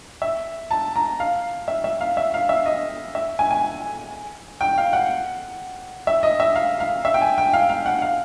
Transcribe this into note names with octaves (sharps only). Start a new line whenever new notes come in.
E5
A5
A#5
F5
E5
E5
F5
E5
F5
E5
D#5
E5
G#5
G#5
G5
F5
F#5
E5
D#5
E5
F5
F5
E5
G5
G#5
G5
F5
F5
F#5
F5